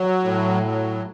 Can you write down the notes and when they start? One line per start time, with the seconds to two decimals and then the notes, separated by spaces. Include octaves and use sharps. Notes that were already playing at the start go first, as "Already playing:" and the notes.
Already playing: F#3
0.24 A2
0.65 F#3